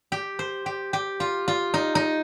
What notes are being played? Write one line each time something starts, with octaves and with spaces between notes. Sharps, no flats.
G4
C5
G4
G4
F4
F4
D#4
D#4